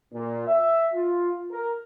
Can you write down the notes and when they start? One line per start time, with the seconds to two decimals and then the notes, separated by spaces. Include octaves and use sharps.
0.14 A#2
0.47 E5
0.94 F4
1.51 A#4